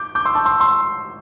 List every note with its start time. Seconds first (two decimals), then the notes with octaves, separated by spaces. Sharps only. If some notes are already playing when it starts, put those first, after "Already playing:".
Already playing: D6 G6
0.15 D6 G6
0.25 C6 E6
0.35 A5 D6
0.45 C6 E6
0.60 C6 E6